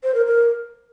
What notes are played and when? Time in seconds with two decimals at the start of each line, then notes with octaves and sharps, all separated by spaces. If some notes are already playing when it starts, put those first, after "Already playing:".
0.04 C5
0.15 A#4
0.26 A#4